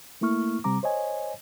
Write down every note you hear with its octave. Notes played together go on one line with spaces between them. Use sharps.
A3 A#3 E4 C#6 F6
C3 G3 C4 A#5 D6
C5 C#5 D#5 G#5